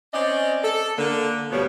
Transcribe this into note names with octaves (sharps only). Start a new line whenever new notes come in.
C4 C#4 D5 D#5
A4
D3 A#3
D2 B2 F3 G3 B3 C#5